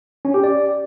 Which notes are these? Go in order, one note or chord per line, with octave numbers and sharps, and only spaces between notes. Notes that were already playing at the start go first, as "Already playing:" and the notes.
C#4
G4
D5